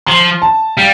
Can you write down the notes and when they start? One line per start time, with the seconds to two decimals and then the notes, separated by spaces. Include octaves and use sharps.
0.06 F3 C6
0.42 A5
0.77 G3 F5